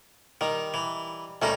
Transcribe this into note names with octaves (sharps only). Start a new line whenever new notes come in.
D#3 G3 D#4
E3
D2 G3 A3 C#4 D#4 A#4